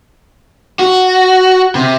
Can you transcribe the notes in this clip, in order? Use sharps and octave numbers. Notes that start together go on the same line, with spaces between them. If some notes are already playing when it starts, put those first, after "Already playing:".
F#4
C3